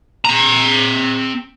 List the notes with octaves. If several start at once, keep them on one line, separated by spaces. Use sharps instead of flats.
C4 A#5